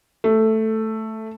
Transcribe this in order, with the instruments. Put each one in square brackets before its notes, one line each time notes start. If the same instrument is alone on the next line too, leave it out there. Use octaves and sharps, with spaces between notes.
[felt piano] A3